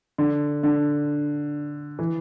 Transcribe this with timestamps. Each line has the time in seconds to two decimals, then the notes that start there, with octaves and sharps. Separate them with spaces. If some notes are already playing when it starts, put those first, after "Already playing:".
0.18 D3
0.63 D3
1.99 E3